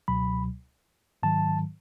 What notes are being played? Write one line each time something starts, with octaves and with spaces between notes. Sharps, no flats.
C#2 B2 F#3 B5
G#2 D#3 F#3 A5